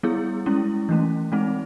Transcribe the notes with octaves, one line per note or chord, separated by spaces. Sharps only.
G3 B3 E4 G#4
G#3 C#4 E4
E3 A3 C#4
G#3 C4 D#4